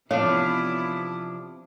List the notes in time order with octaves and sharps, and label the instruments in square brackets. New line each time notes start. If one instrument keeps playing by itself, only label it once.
[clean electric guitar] C3 F3 D4 [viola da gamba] E3 B3 E4 [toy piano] C#5 [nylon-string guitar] F5